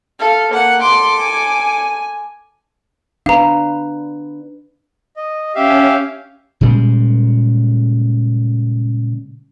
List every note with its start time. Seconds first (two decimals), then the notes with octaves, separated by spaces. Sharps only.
0.20 A4 F5
0.53 A#3 F#5
0.82 A4 C6 D6
1.21 G#5
3.26 D4 B4 F5 A#5
5.16 D#5
5.55 C#4 G4 E5 F5
6.61 A#2 C#3 G3 G#3